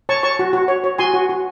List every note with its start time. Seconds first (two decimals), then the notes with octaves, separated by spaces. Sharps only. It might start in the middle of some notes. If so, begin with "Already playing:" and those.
0.09 C#5 A5 C#6
0.23 C#5 A5 C#6
0.39 F#4
0.53 F#4
0.68 C#5
0.84 C#5
0.98 F#4 G#5 C6
1.14 F#4
1.29 F#4